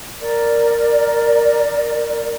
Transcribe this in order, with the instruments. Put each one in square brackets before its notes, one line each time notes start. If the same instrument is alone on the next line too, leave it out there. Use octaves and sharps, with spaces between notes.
[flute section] A#4 D5